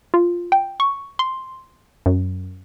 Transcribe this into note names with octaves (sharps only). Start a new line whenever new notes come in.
F4
G5
C#6
C6
F#2